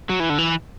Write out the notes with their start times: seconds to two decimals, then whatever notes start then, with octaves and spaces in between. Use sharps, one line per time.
0.09 F#3
0.20 E3
0.30 D3
0.38 E3